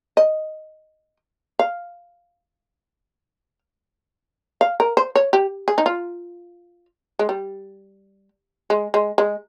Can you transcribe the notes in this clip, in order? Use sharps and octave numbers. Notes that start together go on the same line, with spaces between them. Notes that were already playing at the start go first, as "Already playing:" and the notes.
D#5
F5
F5
A#4
C5
C#5
G4
G#4
D#4
F4
G#3
G3
G#3
G#3
G#3